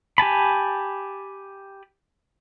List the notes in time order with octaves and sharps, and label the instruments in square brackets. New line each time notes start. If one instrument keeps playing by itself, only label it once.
[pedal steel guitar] G4 G#5 A5 B5